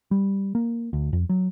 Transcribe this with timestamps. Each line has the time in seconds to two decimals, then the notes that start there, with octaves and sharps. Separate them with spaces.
0.11 G3
0.55 A#3
0.93 D2
1.13 F2
1.29 F#3